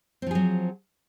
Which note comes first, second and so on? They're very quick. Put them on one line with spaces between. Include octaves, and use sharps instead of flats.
C4 F3 G#4 F#3